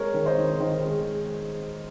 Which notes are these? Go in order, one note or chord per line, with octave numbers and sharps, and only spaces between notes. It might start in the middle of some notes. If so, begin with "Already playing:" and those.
Already playing: G#3 A#4 C#5
D#3
C5 D#5
D#3
D#3 C5 D#5
G#3